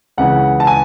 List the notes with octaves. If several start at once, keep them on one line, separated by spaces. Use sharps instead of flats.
C#2 C#3 E3 F#5
A5
G#5